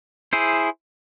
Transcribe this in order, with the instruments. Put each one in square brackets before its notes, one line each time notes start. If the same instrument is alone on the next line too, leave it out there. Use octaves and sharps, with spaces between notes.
[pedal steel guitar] E4 G#4 C5